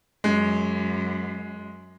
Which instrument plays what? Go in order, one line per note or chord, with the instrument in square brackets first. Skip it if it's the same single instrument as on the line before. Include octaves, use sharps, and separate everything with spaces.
[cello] F#2 [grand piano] G#3